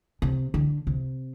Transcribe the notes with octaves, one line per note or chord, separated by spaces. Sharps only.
C3
D3
C3